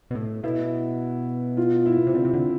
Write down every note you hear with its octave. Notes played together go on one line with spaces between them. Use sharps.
B2
A2
B2 E4
F4
E4
C3
D3 C4
C3
D3